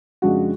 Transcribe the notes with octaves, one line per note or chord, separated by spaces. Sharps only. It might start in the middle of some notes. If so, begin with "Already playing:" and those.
F2 C#3 G#3 D4 F#4